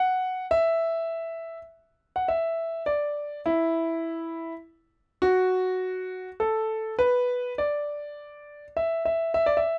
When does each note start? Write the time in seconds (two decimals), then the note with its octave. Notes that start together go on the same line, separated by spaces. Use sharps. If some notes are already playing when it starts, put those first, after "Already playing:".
Already playing: F#5
0.51 E5
2.16 F#5
2.28 E5
2.86 D5
3.46 E4
5.22 F#4
6.40 A4
6.99 B4
7.58 D5
8.77 E5
9.05 E5
9.34 E5
9.46 D5
9.57 E5